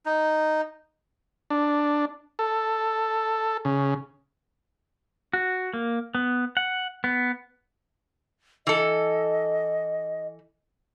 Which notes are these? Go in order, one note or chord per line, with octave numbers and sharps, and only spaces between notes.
D#4
D4
A4
C#3
F#4
A#3
B3
F#5
B3
E3 A4 D#5